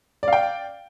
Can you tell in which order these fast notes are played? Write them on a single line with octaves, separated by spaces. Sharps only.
D5 F5 G5